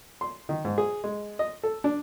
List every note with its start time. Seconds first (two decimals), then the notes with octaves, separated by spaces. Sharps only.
0.21 C6
0.49 D#3
0.65 G#2
0.78 G#4
1.04 G#3
1.39 D#5
1.63 A4
1.84 D4